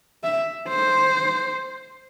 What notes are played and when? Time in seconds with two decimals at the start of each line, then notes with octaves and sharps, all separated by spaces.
0.24 E5
0.68 C5